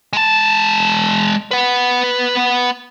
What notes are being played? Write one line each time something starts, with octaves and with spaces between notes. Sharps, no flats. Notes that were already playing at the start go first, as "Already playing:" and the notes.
G#3 A5
B3 B4